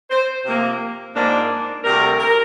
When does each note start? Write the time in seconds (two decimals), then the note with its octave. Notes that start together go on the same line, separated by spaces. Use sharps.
0.10 C5
0.45 C3 F3 A#3
1.15 G#2 F3 A#3 D4
1.84 D2 C3 G3 A#4
2.19 A#4